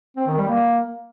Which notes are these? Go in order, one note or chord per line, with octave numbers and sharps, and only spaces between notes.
C4
D#3
G3
A#3